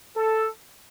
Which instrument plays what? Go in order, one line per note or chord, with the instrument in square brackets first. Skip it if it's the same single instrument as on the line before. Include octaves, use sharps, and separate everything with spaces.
[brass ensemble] A4